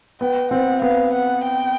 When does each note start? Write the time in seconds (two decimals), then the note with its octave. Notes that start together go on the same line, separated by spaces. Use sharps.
0.21 B3 G5
0.51 C4 F#5
0.82 B3 F5
1.12 F#5
1.43 G5